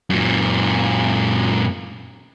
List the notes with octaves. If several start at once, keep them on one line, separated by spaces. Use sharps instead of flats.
F#2 A#2